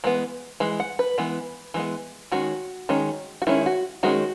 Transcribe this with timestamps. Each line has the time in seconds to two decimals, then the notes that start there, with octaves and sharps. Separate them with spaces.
0.04 E3 G#3 B3
0.60 E3 G#3
0.80 F#5
0.99 B4
1.18 E3 G#3 B3
1.74 E3 G#3 B3
2.32 D#3 G#3 C#4 F#4
2.89 D#3 G#3 C#4
3.42 F#4
3.47 D#3 G#3 C#4 E4
3.66 F#4
4.03 D#3 G#3 C#4 F#4